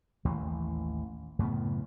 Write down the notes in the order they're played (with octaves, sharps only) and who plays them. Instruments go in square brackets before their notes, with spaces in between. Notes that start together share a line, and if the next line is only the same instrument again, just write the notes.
[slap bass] A1 D#2 E3
F#2 A2 C#3 B3